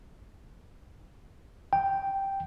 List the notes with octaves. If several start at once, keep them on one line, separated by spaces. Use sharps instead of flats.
G5